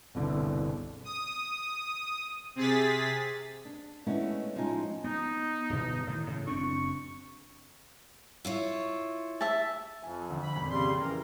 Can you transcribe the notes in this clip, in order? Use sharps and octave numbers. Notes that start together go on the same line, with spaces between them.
G1 C2 B2 D3
D#6
C3 G#4 A6 B6
D4
G#3 A3 B3 C#4 D4 E4
A2 F3 G#3 C#4 D#4 G#5
B3 D#4
D1 G1 B2
A2 D#3 E3
A2 C#3
F#1 C4 D4 C#6
E4 F4 C#5
E5 A5
F2 G#5
D2
B5
G#1 F2 A#2
C#3 G3 C6
C#3 E3 A#4